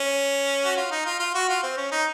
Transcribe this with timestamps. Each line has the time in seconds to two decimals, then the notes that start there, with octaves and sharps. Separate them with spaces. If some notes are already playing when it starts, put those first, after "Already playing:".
Already playing: C#4
0.65 F#4
0.77 F4
0.91 D#4
1.06 F4
1.20 F4
1.35 F#4
1.49 F4
1.63 C4
1.77 C#4
1.92 D#4